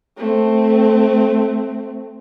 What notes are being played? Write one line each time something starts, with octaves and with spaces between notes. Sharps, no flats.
A3 C4